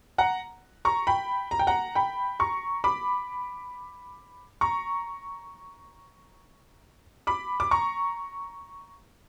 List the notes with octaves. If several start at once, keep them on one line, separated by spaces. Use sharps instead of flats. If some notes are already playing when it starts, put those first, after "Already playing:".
F#5 A#5
A#5 C#6
G5 B5
A#5
G5
F#5 A#5
G5 B5
A#5 C#6
B5 D6
A#5 C#6
B5 D6
D6
A#5 C#6